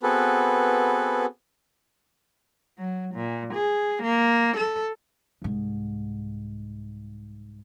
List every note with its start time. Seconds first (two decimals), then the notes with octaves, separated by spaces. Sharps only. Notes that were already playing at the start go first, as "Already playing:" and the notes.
0.03 B3 C4 F#4 G#4 A4 B4
2.78 F#3
3.15 A#2
3.54 G#4
4.03 A#3
4.57 A4
5.42 C2 G#2